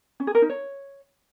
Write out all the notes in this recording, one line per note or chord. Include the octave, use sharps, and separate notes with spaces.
C#4
G#4
A#4
D#4
C#5